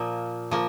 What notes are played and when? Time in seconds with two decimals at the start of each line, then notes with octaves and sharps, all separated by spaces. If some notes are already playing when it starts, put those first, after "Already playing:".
Already playing: A#2 F3 A#3
0.51 F3 A#3